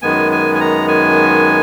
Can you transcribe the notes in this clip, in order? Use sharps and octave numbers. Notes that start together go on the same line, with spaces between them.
F#2 D#3 G#3 B3 G#5
G#5
G#5
A#5
G#5